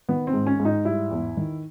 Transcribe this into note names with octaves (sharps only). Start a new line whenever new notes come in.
D#3 B3
C4
G#2
C#4
G#2
D#4
G3 E4
E2
D#3